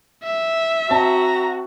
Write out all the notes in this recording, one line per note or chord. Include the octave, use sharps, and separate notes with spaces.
E5
C4 F#4 A5 A#5